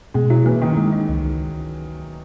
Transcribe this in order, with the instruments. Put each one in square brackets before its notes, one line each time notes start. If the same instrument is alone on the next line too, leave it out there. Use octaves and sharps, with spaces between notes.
[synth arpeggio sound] B2 [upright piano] G#3
[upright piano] F#3 [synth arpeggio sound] E4
[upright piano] E3 [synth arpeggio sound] A#3
[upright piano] D#3 [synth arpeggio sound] D#4
[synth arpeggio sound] G#3
D#4
C#2
C#2